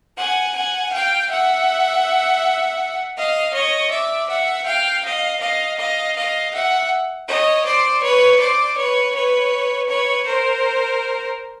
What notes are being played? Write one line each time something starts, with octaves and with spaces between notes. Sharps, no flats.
F#5 G#5
F#5 G#5
F5 G5
E5 F#5
D#5 F5
C#5 D#5
D5 E5
E5 F#5
F5 G5
D#5 F5
D#5 F5
D#5 F5
D#5 F5
E5 F#5
C#5 D#5
C5 D5
B4 C#5
C5 D5
B4 C#5
B4 C#5
B4 C#5
A#4 C5